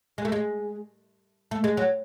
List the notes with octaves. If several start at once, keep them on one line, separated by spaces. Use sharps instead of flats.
G#3
A3
G#3
A3
G#3
F#3